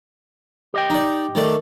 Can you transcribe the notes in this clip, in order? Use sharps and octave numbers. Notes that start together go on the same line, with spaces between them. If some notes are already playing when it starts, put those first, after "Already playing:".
G4 D#5 G5
D#4 D5
D#3 A3 D5